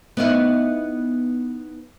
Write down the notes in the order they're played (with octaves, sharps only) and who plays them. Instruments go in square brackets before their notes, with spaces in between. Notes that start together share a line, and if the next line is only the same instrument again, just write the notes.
[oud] B3 D#4 E4